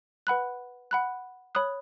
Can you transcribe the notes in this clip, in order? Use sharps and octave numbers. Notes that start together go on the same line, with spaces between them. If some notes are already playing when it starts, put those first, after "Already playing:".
B4 F#5 B5 F#6
F#5 B5 F#6
C#5 B5 D#6 F#6